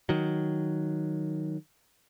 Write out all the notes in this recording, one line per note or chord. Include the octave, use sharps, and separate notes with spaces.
D#3 F#3